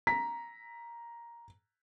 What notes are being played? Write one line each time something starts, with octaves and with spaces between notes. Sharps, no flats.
A#5 B6